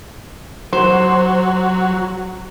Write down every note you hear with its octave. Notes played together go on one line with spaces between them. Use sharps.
F#3 C5